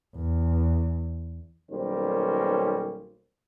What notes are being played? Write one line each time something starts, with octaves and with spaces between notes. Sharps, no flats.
E2
B1 D#3 G3 A#3 C#4 C5